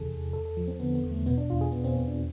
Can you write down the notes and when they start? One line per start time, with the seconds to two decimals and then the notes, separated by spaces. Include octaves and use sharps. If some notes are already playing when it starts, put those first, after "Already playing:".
Already playing: E2 C3 E3 G#4 A4
0.10 E2
0.33 E2 A4
0.45 A4
0.57 F3
0.68 C4
0.80 D3 B3
0.95 B3
1.03 E2
1.11 A3
1.26 B2 B3
1.38 D4
1.49 E2 F4
1.61 G#4
1.72 B2 B3
1.84 C4
1.96 E2 B3
2.08 D4